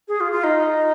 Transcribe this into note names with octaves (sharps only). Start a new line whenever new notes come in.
G#4
F4
F4
D#4